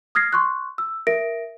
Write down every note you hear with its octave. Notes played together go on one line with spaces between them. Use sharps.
D#6 F6 G#6 A#6 C7
C6 C#6 F#6
E6
A#4 E5 A#6 D7